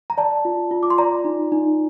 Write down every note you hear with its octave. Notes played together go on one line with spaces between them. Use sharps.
A#5
D5 A5
F4
F4
D6
C6
D5 A#5
D#4
D#4